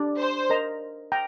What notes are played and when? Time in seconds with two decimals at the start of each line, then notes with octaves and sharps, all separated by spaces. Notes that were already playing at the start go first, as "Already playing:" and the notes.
Already playing: D4 G4 D5
0.18 C5
0.50 A#4 D#5 A#5
1.12 G5 A#5